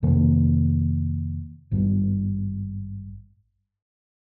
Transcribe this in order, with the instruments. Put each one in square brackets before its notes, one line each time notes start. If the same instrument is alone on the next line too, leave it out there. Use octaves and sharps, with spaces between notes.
[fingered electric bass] F2 C3 D#3 A#3
G#1 G2 G3